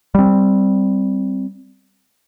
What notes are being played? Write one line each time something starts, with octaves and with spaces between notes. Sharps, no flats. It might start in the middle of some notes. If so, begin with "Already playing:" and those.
G3 C4